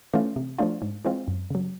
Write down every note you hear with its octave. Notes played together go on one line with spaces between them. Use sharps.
E3 A3 C#4 F4
C3
F3 A3 D4 F4
G#2
E3 G#3 C4 F4
F#2
C#3 F#3